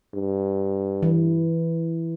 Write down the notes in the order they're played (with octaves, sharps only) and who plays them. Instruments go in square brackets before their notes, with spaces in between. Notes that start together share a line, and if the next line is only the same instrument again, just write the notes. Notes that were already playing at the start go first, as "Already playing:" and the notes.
[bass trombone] G2
[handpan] E3